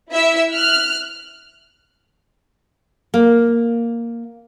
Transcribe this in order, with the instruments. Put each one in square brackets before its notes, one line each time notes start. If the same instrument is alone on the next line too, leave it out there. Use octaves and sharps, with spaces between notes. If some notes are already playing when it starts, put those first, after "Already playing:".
[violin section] E4 E5 E6
F6 F#6
[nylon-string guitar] A#3